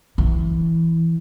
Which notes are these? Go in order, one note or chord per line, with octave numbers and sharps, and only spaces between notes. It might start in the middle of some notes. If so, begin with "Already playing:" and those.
E3